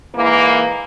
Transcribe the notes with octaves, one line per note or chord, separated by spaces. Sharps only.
G#2 E3 A#3